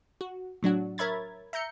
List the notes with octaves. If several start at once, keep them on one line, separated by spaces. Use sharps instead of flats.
F#4
A2 F#3 D4 F#4
A#4 C#5 E5 B5 G#6 A6
E5 A#5 G6 C#7